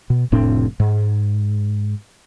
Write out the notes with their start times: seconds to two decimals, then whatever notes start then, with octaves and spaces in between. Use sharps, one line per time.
0.10 B2
0.32 F1 A2 C4 D4
0.80 G#2